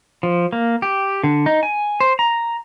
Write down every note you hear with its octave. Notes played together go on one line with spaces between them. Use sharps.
F3
A#3
G4
D3
D#4
G#5
C5
A#5